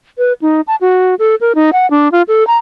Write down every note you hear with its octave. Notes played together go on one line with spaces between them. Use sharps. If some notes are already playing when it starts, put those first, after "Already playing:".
B4
D#4
A5
F#4
A4
A#4
D#4
F#5
D4
F4
A4
A#5